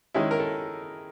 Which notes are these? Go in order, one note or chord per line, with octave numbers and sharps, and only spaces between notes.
D#3 G#3 C#4 E4 G#4
A#4
A4